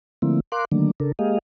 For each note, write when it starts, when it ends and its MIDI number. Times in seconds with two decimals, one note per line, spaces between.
0.22 0.40 50
0.22 0.40 53
0.22 0.40 57
0.22 0.40 58
0.22 0.40 60
0.22 0.40 64
0.52 0.65 70
0.52 0.65 77
0.52 0.65 84
0.52 0.65 86
0.52 0.65 90
0.72 0.91 50
0.72 0.91 51
0.72 0.91 54
0.72 0.91 57
0.72 0.91 58
0.72 0.91 62
1.00 1.12 49
1.00 1.12 62
1.00 1.12 69
1.00 1.12 70
1.19 1.38 56
1.19 1.38 58
1.19 1.38 67
1.19 1.38 68
1.19 1.38 75
1.19 1.38 77